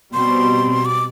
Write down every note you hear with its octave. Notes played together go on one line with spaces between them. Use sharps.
B2 G3 C4 C6
D6